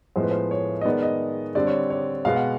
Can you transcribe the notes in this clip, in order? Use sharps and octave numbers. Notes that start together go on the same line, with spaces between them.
A2 F3 G#3 B3 C5
B4
C5
C#5
D#5
D#3 G#3 B3 D5
D#5
D3 G3 C4 D5
C#5
C#5
B2 G#3 B3 F5
F#5